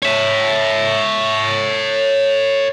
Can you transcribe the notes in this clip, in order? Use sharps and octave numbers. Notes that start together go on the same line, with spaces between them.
C#5 E5